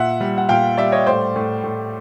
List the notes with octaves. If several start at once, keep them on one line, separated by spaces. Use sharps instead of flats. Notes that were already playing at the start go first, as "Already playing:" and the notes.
Already playing: A#2 E5 F#5
G3
F#5
A#2 F5 G5
G3 D5 E5
C#5 D#5
A2 C5 D5
A2
A2